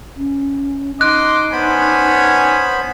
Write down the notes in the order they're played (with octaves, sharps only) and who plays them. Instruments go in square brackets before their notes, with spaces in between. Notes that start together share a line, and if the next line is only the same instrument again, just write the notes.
[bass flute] C#4
[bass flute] D#4 [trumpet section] D#5 C6 D6 [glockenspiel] F#6
[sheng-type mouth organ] B3 C5 B5 [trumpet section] C#4 D4 G#5